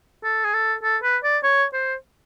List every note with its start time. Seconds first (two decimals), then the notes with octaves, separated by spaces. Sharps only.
0.24 A4
0.44 G#4
0.54 A4
0.83 A4
1.03 B4
1.24 D5
1.44 C#5
1.73 C5